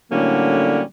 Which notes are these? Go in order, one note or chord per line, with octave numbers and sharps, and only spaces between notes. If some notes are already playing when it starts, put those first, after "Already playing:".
A2 D3 F#3 G3 A#3 C#4